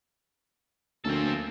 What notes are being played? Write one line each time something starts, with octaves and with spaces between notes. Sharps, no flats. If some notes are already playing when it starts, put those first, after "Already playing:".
D2 A#3 C4 C#4 A4